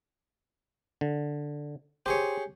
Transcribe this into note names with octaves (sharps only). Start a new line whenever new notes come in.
D3
G4 G#4 C5 C#5